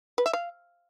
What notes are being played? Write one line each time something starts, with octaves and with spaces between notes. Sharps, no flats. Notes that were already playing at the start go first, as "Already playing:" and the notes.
B4
E5
F5